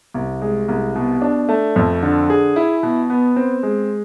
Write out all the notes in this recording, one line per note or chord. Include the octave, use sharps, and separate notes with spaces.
C2
G#3
C2
B2
D4
A3
F2
D3
G#4
E4
B2
B3
C4
G#3